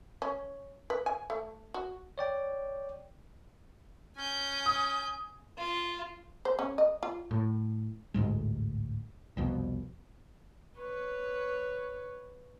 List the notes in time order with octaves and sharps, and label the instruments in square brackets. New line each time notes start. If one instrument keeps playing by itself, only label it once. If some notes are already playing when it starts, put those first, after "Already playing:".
[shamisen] C#4
B4
G#5
A3
F#4
[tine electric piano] C#5 D5 G5
[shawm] C#4 [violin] G#5 G6
[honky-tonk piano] D#6
[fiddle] F4
[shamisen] C5
C#4
D#5
F4
[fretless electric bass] A2
A1 D2 G#2 G#3
F#1 C2 F2 B2
[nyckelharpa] B4 C#5